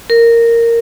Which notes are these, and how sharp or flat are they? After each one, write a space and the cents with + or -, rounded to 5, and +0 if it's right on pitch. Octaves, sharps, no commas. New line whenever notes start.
A#4 -10